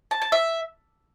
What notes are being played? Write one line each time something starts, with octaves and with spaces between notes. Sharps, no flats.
A5
A5
E5